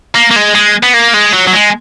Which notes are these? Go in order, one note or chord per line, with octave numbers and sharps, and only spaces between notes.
A#3
A#3
G#3
G#3
B3
A#3
G#3
F#3
F#3
G#3